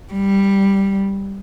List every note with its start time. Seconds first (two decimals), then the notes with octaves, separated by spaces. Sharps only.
0.12 G3